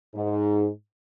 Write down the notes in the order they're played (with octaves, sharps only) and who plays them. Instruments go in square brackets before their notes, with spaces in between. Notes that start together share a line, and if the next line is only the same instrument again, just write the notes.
[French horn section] G#2